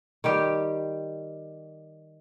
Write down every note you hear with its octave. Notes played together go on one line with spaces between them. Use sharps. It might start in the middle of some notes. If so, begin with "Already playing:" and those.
D#3 G3 G4